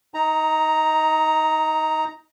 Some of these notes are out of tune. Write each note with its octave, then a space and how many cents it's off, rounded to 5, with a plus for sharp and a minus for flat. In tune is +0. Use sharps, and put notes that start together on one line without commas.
D#4 +20 A#5 +0